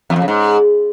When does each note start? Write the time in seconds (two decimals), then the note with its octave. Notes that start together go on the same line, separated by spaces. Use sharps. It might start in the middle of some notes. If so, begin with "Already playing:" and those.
0.10 E2
0.16 F2
0.22 C#3
0.28 G#2